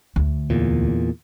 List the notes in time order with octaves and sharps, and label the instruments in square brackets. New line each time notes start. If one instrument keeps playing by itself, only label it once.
[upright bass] D2
[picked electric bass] E2 A#2